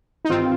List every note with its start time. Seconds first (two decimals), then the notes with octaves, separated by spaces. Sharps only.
0.25 D#4
0.30 G2 D#3 C4 F4